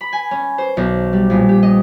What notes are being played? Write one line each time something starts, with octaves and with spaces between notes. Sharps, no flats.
B5
G#5
C#4
C5
B1
G3
A#1
G4
D#5